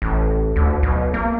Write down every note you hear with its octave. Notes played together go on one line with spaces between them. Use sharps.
A1
D2
B1
A#3